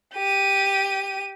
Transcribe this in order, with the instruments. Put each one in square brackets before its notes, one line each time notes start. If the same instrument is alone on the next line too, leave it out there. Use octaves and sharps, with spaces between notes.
[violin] G4 D#7